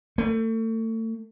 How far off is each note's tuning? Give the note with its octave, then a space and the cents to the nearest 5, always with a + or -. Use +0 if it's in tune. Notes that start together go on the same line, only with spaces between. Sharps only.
A3 +35